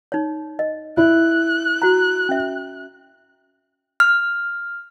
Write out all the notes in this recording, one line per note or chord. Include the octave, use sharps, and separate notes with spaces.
D#4 C#5
D#5
E4 F#6
F#4 A#5
C#4 E5
F6